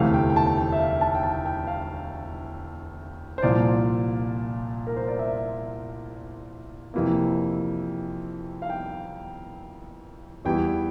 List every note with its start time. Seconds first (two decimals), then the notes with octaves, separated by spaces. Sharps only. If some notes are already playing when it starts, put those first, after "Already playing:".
Already playing: E1 D2 C3 E3 A3 F5
0.14 G5
0.30 G5
0.36 A5
0.57 G5
0.72 E5
0.80 F5
1.01 A5
1.15 G5
1.23 A5
1.46 G5
1.67 F5
3.38 C5
3.42 C2 A#2 F3 D5
4.87 A#4
4.96 C5
5.08 D5
5.19 E5
6.94 F2 C3 E3 A#3
8.62 F5
8.70 G5
10.45 E2 E3 G3 G5